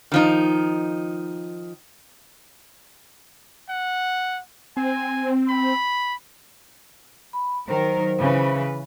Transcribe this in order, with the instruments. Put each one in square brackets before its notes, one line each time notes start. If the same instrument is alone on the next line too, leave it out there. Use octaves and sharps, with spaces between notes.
[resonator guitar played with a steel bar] D#3 F3 D#4
[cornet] F#5
[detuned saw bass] C4 [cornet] G#5
[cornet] B5
[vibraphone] B5
[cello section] D#3 F#3 A#4 [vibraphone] C5
[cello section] C#3 E3 B4